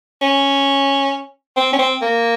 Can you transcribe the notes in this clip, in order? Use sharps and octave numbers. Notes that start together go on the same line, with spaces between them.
C#4
C4
C#4
C4
A#3